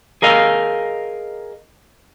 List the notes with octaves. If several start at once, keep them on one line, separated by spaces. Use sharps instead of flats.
G#4 A#4 D#5 F5